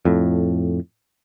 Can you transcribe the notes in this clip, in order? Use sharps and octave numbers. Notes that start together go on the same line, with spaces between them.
F2 A2